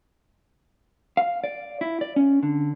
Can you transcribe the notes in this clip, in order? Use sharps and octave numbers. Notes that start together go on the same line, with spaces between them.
F5
D5
E4
D5
C#4
D3